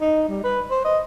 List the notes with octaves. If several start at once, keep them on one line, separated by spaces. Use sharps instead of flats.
D#4
G3
B4
C5
D#5